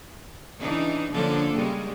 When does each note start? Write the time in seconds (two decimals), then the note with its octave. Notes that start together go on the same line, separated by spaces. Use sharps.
0.60 C#3 E3 D4 D#4
1.12 D3 F3 A#3 C#4 D4 A4
1.54 C#3 G3 G#3 A#3